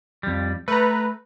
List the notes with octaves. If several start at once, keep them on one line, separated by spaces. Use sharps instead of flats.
F2 G3
A3 B4 A#5